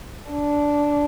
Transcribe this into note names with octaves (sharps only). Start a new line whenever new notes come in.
D4